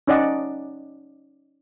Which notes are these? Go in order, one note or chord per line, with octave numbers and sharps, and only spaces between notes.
C#4 D#4 D5 D#5 F#5